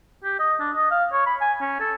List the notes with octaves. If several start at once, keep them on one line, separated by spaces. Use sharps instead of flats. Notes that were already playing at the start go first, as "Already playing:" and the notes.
G4
D#5
D4
D#5
F5
C#5
B5
G#5
C#4
A4